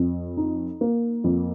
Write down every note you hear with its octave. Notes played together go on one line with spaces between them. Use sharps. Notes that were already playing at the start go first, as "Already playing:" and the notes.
Already playing: F2
D#4
A#3
F2